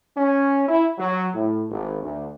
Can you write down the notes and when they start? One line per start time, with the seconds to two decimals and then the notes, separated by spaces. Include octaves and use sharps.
0.17 C#4
0.69 E4
0.98 F#3
1.34 A2
1.70 G#1
2.02 D2